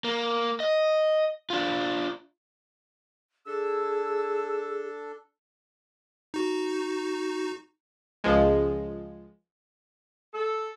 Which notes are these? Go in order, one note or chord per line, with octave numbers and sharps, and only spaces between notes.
A#3
D#5
D4 F4
D4 G#4 A4 E6
D#4 F#4
C#2 F3 G#3
A4